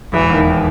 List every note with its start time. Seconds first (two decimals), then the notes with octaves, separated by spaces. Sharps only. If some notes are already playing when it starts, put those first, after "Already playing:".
0.13 E1 E3
0.30 D#2 D#3